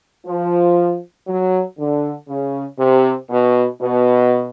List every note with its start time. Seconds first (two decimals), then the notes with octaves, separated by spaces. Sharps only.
0.26 F3
1.27 F#3
1.78 D3
2.28 C#3
2.79 C3
3.30 B2
3.80 B2